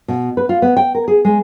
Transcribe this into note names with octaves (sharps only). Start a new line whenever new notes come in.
B2
B4
F4
B3
G5
A#4
G#4
G#3